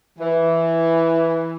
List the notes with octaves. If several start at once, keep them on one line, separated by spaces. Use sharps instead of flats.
E3